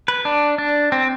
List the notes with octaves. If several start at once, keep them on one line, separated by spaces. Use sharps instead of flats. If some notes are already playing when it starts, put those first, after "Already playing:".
B4
D4
D4
C4